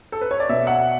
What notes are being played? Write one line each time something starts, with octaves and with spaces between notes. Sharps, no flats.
A4
B4
C#5
D5
B2 E5
F#5